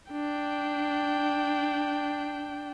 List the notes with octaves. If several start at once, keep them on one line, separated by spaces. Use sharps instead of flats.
D4 G5